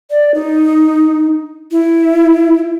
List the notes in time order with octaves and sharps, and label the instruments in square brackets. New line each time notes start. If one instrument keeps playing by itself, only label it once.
[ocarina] D5
D#4
E4